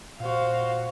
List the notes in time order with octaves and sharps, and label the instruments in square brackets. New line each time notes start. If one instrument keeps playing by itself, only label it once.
[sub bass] A#2 [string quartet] F#4 C5 F5